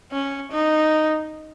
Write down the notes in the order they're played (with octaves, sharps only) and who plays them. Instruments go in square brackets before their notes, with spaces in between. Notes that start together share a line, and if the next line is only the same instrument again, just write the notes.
[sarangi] C#4
D#4